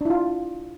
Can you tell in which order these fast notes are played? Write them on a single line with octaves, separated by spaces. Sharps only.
D4 E4 F4